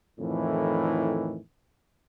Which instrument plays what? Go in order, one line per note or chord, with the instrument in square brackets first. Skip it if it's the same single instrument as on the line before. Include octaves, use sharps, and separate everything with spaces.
[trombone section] F2 A2 D#3 E3